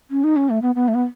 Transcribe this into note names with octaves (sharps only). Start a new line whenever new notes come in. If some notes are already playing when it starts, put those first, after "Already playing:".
C#4
D#4
C#4
A3
B3
B3
A3
B3